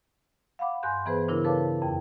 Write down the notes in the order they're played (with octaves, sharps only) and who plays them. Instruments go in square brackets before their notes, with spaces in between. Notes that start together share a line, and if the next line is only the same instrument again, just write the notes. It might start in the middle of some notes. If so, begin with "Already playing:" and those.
[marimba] F5 F#5 B5 D6
G2 G#5 C6 F#6 G6
E3 B3 G#4 B4 C5
C#3 D4 E4 A#4
A4 B4 C#5 F5 A5 D6
F2 G5